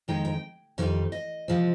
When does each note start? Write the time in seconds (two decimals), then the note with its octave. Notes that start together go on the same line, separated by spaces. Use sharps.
0.08 F2 D#3 G#3 D#4 G5
0.25 G5
0.78 F2 D#3 G3 C4 D#4
1.12 D#5
1.48 C3 F3 G#3 C4